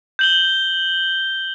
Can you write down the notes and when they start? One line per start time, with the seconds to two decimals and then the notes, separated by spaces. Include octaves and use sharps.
0.19 G6 F#7 G7